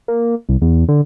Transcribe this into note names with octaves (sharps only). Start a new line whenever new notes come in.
A#3
C2
E2
D3